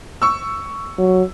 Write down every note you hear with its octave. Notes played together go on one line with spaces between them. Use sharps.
C#6 E6
F#3